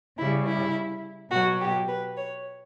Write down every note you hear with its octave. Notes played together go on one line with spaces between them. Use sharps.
C#3 G3 E4
E4
B2 F#3 F#4
G4
B4
C#5